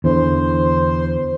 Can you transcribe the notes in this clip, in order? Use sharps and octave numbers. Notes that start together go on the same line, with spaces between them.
E2 D3 E3 C5